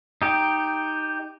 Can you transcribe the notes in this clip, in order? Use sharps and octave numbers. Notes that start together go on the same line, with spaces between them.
D#4 G4